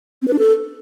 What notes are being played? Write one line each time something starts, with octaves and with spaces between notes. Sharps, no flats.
C4
B4
D4
A4